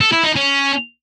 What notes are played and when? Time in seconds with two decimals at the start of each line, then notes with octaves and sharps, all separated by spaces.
0.01 A4
0.12 E4
0.24 D#4
0.36 C#4